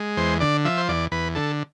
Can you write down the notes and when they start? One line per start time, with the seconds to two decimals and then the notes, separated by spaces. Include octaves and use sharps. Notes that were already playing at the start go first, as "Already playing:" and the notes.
Already playing: G#3
0.17 E2 C5
0.40 D3 D5
0.65 F3 E5
0.77 C5
0.88 E2 D5
1.12 E2 B4
1.35 D3 A4